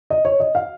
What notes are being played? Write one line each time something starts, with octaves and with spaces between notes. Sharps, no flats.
D#5
C#5
D#5
F5